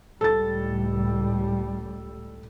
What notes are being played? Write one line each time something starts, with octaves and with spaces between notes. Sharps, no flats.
C#2 A2 G3 A4 A6